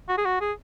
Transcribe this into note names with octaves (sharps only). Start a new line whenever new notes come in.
F#4
G#4
F#4
G#4